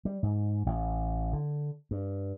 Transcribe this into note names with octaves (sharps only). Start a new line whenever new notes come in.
G3
G#2
A1
D3
G2